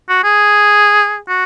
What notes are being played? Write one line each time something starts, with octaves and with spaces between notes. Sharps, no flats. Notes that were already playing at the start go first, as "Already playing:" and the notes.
F#4
G#4
F#4